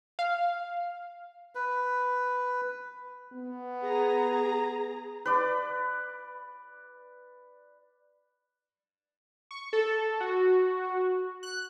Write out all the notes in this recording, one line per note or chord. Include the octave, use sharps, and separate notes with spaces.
F5
B4
B3
G#4 A#5
B4 D5
C#6
A4
F#4
F#6